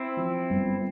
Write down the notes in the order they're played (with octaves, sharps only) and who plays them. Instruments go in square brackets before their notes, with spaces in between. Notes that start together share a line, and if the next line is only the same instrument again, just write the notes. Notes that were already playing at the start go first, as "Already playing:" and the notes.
Already playing: [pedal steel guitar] C4 E4
[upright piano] F3
G1